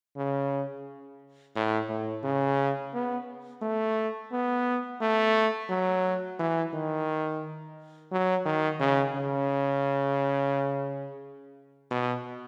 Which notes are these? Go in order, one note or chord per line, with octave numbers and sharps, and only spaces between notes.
C#3
A2
A2
C#3
B3
A3
B3
A3
F#3
E3
D#3
F#3
D#3
C#3
C#3
B2